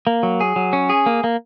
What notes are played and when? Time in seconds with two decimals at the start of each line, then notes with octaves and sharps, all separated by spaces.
0.07 A#3
0.23 F#3
0.41 G#4
0.56 F#3
0.73 C#4
0.89 G#4
1.06 A#3
1.24 A#3